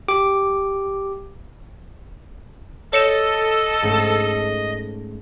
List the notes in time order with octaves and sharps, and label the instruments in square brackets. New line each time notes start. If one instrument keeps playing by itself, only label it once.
[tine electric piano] G4 D6
[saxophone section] A4 [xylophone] C#5 C#7 E7 [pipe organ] D#5
[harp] G#2 A3 C#4